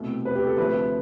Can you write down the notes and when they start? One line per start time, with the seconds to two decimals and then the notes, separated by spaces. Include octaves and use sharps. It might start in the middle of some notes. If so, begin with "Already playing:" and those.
Already playing: C2 B2 A3
0.25 B4
0.35 G4
0.47 A4
0.57 D2 C3 F3 A3 B4